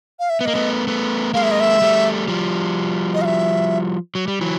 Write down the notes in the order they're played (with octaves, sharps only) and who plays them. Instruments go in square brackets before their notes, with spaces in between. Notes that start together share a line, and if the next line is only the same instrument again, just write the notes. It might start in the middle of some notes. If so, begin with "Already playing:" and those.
[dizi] F5
E5
[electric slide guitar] B3 [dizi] E5
[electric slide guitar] A#3 [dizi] D#5
[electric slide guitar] A3 B3
A3 B3
[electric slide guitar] G#3 A#3 [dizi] F5
[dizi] E5
D#5
E5
[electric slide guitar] G3 A3
F3 G3
[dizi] D#5
F5
E5
[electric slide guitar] F#3
G3
E3 F#3